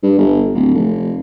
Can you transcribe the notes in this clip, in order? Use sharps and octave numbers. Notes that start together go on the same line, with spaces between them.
G2
G1
D1
F1